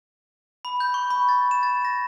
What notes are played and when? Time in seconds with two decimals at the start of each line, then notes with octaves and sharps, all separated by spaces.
0.65 B5
0.80 G6
0.94 C#6
1.11 B5
1.29 A6
1.51 E7
1.63 A6
1.85 A#6